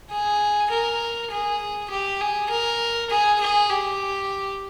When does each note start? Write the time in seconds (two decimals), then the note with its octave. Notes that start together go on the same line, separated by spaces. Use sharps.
0.11 G#4
0.70 A#4
1.31 G#4
1.90 G4
2.21 G#4
2.50 A#4
3.10 G#4
3.40 G#4
3.70 G4